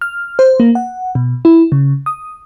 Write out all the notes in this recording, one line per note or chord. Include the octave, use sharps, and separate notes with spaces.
F6
C5
A#3
F#5
B2
E4
C#3
D#6